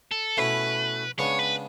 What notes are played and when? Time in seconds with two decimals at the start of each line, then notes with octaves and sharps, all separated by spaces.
0.11 A4
0.37 B2 A3 C#4 E4 B4
1.18 C#3 G#3 B3 D4 C#5
1.39 B4